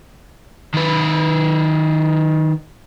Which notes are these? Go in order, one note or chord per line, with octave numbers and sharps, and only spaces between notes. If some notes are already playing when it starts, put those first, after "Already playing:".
D#3 B4